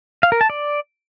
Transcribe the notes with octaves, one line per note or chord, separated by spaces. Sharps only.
F5
A#4
A5
D5